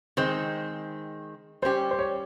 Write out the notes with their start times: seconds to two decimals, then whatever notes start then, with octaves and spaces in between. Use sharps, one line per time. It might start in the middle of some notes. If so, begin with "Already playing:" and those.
0.17 D#3 G#3 C4 C5
1.62 G3 C#4 G4 C5
1.91 C5
1.99 C#5